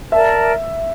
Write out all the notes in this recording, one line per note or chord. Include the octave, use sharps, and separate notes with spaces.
A#4 D5 E5 A5